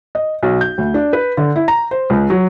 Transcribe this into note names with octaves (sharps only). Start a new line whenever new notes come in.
D#5
B1
G6
D2
D4
B4
D3
E4
A#5
C5
C#2
F#3